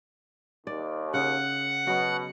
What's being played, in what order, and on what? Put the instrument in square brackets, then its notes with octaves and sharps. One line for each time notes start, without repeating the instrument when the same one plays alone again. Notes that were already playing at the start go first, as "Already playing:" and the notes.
[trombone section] D#2 [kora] D5
[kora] C#3 [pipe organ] F#5
[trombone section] B2 [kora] F#3 F#4